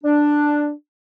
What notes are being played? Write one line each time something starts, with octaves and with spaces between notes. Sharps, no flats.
D4